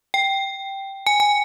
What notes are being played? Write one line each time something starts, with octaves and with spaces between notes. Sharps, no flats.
G5
G#5
G#5